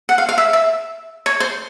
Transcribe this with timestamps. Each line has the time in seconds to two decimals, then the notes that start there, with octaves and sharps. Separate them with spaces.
0.09 F#5
0.18 F5
0.29 F5
0.38 E5
0.53 E5
1.26 C#5
1.40 C5